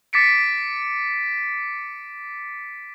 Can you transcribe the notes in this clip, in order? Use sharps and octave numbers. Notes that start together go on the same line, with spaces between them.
D6 A6 B6 C#7 D7